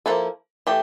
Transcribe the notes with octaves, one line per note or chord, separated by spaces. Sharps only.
F3 A#3 E4 A4
E3 A3 G4